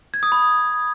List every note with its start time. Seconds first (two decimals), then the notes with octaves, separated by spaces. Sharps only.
0.14 G#6
0.23 D#6
0.32 B5